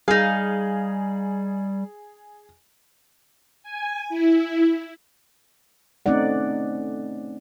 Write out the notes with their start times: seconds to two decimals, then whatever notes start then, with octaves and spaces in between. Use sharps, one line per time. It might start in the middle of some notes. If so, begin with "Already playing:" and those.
0.08 G3 D#4 G#4 F5
3.63 G#5
4.09 E4
6.06 A3 C4 C#4 D#4 D5 F#5